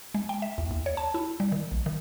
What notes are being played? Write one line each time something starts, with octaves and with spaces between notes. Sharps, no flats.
G#3
G5
E5
E2
D#2
C#5
A5
E4
G3
D#3
A#1
D#3